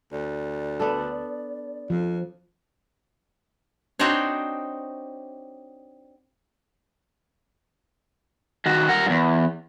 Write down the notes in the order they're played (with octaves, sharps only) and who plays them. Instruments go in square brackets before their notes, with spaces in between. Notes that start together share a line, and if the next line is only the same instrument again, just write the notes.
[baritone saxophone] D2 [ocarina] D5
[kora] B3 D4 A4
[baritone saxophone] F2 [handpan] F3
[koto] C4 D4 D#4 F#4 C5 C#5
[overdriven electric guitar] D#3 F#4
A#4 F#5
E2 G2